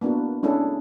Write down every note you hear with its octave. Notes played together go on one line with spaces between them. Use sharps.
A#3 B3 D4 E4 F#4
G#3 C#4 D4 E4 G#4 A4